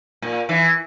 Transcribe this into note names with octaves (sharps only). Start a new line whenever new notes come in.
A#2
E3